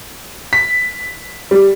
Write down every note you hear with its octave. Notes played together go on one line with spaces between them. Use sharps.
B6
G3